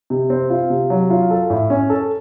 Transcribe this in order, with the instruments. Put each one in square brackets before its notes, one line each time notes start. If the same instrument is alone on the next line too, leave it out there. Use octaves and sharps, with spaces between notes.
[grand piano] C3
C4
F4
C3
F#3
F4
A4
A2
C#4
A4